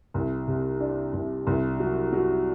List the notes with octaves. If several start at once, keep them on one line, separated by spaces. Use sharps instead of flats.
C2
C3
D4
C2
C2
F#3
F#3